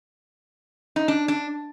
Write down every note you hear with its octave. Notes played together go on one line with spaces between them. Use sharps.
D#4
D4
D4